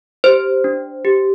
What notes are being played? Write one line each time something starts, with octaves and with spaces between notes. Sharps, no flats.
G4 C5
D4
G4